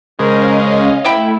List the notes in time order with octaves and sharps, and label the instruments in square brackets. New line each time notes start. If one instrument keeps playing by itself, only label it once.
[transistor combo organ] C#3 G#3 [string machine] C#4 D#5 F5 [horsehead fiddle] A#4 C5
[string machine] A3 [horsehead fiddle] E4 [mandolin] E5 G5 B5